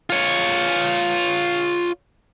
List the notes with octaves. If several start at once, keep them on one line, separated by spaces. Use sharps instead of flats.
F4 C#5